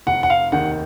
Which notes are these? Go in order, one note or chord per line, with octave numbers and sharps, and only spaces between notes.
F1 F#5
F#5
F5
D#2 D#3 F#5